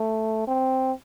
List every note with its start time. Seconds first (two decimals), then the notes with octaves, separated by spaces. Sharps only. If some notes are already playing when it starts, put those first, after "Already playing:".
Already playing: A3
0.47 C4